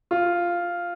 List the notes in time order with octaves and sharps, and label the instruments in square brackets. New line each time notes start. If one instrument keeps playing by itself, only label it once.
[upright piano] F4